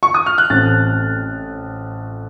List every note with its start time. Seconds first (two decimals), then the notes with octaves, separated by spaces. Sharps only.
0.03 C#6
0.14 D#6
0.26 F6
0.38 F#6
0.50 A1 A2 A3 C4 A6